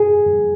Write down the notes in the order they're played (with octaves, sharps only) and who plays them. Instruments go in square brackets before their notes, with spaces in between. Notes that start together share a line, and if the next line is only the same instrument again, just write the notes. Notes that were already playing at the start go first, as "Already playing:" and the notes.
Already playing: [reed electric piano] G#4